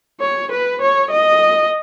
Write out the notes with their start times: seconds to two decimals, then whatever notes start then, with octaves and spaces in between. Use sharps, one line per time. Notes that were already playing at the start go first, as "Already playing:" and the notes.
0.20 C#5
0.51 B4
0.81 C#5
1.11 D#5